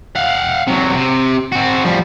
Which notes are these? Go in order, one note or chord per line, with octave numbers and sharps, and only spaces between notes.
F5 F#5
C3 F#3
C3
C4 F#4
F3 G3